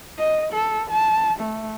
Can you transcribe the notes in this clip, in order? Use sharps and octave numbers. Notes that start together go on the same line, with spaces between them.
D#5
A4
A5
A3